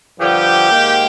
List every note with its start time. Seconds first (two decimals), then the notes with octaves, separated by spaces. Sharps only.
0.20 G2 D3 F3 G4
0.71 G#2 D#3 A#3